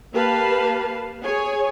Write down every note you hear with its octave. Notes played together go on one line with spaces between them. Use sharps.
A#3 G4 B4 F5 A5
G#4 C#5 G#5